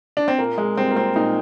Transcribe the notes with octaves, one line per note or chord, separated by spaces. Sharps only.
D4
C4
A#2 A#3
G#3
G3 C4
A#3
C4
A#2 D#4